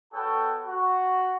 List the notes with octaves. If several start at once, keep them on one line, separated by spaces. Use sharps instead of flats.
B3 F#4 A4 C#5 G5 A5
F#4